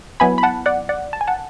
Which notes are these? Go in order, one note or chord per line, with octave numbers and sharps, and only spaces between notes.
F#3 B3 E4 G#5 B5
B5
F#5 A5
D5 F#5
D5 F#5
A5
G#5
F#5 A5